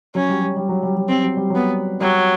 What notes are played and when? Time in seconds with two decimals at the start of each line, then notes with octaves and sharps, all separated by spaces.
0.15 F#3 C#4
0.29 G3
0.42 F#3
0.57 G3
0.69 F#3
0.83 G3
0.97 F#3
1.08 G3 C4
1.24 F#3
1.37 G3
1.50 F#3
1.55 B3
2.01 F#3 G3